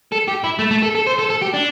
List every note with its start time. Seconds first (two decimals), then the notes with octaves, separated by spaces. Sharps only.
0.12 A4
0.28 G4
0.44 E4
0.59 A3
0.71 A3
0.83 A4
0.95 A4
1.07 C5
1.19 A4
1.30 A4
1.42 G4
1.54 D4